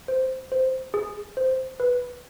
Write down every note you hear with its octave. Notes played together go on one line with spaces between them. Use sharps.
C5
C5
G#4
C5
B4